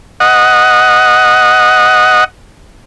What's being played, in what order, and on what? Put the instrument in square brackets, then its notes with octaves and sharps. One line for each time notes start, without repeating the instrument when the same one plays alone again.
[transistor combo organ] D#5 F#5